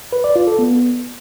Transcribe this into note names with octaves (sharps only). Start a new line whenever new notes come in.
B4
D5
F4
A4
B3